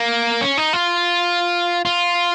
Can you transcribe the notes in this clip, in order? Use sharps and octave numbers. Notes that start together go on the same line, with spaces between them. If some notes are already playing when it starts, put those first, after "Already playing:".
Already playing: A#3
C#4
D#4
F4
F4